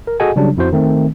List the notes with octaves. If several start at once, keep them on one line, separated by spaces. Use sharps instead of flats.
A#4
F#4 G#4 A4 D#5 F#5 G#5
C#3 F#3 G3 D4
F2 E4 F#4 C5
D#3 A3 C4